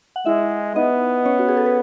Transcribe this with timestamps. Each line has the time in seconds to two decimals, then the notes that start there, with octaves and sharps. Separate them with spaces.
0.16 F#5
0.26 G#3 E4 E5
0.75 B3 D#4 D#5
1.25 C#4 C#5
1.39 F#4
1.48 G#4
1.57 A4
1.66 B4